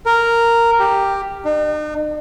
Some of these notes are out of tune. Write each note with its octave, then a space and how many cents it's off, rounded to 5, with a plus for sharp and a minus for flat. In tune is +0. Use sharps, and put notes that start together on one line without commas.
A#4 -5
G4 +5
D#4 -45